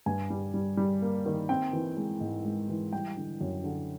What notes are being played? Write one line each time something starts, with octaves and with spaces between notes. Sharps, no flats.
G2 G#5
G3
G3
G3
A#3
D#3
C4 G5
E3
G#3
G#2
G#3
E3
G3 G5
D3
F#2
D3